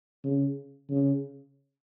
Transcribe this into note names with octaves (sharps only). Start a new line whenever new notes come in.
C#3
C#3